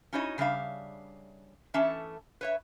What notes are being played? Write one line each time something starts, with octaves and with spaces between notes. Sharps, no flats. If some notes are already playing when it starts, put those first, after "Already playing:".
C#4 D#4 E4 F#4 C#5 D#5
C#3 G3 D4 E5 F5
E3 A3 C#4 A4 E5 A5
B4 C#5 E5